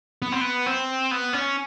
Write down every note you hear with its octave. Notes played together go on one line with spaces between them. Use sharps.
B3
C4
B3
C4
B3
C#4